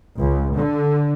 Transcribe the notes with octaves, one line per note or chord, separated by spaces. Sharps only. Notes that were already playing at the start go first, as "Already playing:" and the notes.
C#2
D3